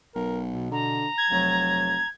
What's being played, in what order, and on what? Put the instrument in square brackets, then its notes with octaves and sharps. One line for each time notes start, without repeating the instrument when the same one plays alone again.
[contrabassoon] B1 [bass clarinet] A#4
[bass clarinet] B2
[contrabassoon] D3 [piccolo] A#5
[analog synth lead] G#6
[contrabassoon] F1 [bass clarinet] F#3